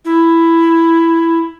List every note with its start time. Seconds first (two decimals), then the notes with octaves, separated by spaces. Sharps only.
0.05 E4